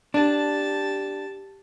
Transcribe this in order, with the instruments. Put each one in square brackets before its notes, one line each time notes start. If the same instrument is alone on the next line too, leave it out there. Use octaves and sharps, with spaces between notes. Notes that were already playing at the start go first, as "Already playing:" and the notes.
[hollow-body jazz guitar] D4 [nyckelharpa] G4 A5